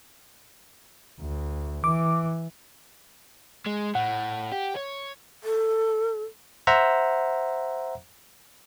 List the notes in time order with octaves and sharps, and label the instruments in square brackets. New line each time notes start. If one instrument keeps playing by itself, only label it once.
[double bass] D2
[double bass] E3 [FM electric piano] D6
[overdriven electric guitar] G#3
[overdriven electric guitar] A2 [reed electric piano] F#5
[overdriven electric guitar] G4
C#5
[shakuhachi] A4
[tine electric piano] C5 E5 F#5 A#5